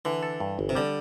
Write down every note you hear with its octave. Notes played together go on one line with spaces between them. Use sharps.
D3 E3
A4
G2
G1
C3
D3 G3